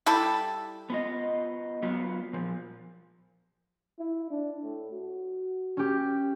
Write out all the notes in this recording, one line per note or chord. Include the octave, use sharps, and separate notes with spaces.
G3 E4 A4
B3 F4 D#5
F#3 B3 F4
A#2 F3
E4
D4
A2
F#4
C#4 G4